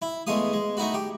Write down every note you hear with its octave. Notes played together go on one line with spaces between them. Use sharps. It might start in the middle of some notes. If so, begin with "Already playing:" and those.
E4
E2 G#3 A3 F5 D#6
G#3
A3 D#4 E4 F#4
G4